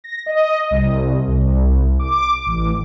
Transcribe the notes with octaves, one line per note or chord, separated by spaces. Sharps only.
A#6
D#5
C2
C2
D6
A1